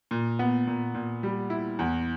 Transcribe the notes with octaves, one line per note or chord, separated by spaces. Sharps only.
A#2
B3
A#2
A#2
G3
E4
E2